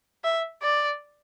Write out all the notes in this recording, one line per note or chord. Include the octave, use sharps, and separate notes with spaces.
E5
D5